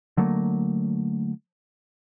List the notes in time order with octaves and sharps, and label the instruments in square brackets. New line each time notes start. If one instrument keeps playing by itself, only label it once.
[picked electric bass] D3 F#3 A3 A#3